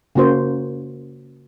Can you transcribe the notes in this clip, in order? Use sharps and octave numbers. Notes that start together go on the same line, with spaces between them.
C#3 A#3 F#4 C5